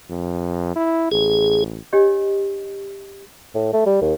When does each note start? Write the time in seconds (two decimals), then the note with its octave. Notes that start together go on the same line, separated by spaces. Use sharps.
0.10 F2
0.76 E4
1.12 A1 G#4
1.93 D4 G4 C#5 D#5
3.55 A2
3.73 A3
3.86 G3
4.02 D#2